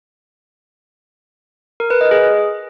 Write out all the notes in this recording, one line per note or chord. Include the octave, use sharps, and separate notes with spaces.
A#4
B4
D#5
G#4